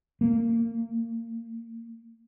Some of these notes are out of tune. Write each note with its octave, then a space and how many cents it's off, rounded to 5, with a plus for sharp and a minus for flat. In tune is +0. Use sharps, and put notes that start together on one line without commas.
A#3 -25